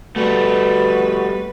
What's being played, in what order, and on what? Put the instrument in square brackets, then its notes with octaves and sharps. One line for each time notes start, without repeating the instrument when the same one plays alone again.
[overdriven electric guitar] G3 A3 [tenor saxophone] F#4 [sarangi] B4